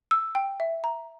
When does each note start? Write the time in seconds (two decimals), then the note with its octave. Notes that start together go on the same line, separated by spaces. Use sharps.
0.11 E6
0.35 G5
0.60 E5
0.84 A#5